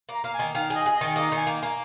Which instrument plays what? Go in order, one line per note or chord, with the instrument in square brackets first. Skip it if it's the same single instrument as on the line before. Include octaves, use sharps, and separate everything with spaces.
[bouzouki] A#3
[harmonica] A#5
[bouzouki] A#3 [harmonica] F5
[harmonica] G#5
[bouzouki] D#3
[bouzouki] D#3 [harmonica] F5
[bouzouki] G#4
[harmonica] D#5
[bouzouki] G#4
[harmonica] D#5
[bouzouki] D#3
[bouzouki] A#3 [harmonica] D#5
[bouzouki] D#3 [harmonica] G#5
[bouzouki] A#3
[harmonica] G#5
[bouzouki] A#3